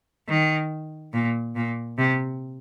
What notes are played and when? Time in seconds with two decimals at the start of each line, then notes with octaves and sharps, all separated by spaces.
0.28 D#3
1.13 A#2
1.56 A#2
1.98 C3